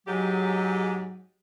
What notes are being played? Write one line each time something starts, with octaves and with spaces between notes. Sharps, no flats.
G#2 F#3 G#3 G4